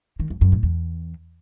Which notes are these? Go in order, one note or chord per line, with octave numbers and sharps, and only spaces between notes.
D#3
F2
F#2
A2
E2